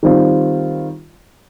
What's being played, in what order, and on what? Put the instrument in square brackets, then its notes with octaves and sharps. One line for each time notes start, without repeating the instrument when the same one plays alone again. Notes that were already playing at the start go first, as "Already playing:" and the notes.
[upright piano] D#3 G3 C4 F4